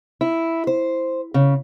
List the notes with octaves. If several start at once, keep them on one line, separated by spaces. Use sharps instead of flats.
E4
C5
C#3